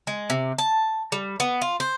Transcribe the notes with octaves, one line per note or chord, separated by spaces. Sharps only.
G#3
C3
A5
G3
B3
F4
C5